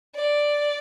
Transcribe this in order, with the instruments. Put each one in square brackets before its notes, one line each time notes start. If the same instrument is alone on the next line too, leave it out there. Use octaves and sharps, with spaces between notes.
[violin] D5